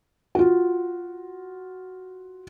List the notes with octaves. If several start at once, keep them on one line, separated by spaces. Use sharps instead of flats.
F4 F#4